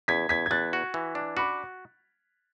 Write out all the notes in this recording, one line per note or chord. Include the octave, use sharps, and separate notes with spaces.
E2 G#6 B6
E2 G#6 B6
G#6
E2 F#6 A6
F#4
E3
D4
F#4 B5 D6